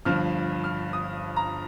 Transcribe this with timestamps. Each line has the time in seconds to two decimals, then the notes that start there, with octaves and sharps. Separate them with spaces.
0.05 G1 G2 F3 F6
0.64 F6
0.93 D#6
1.36 A#5